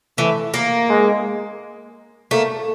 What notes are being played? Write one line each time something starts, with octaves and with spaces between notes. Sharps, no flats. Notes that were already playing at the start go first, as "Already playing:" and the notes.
E3 A3
A#3
G#3
A3 A#3